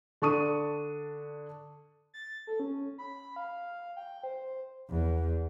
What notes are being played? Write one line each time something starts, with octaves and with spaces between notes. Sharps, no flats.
D3 D4 A5 C#6 D#6 D#7
A6
A4
C#4
B5
F5
G5
C5
E2